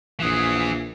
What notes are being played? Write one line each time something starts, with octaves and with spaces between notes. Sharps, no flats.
A#1 E3 G#4